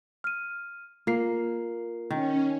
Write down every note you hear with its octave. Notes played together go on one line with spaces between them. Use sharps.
F6 D#7
A#3 F4 A#4 C7
D#3 C#4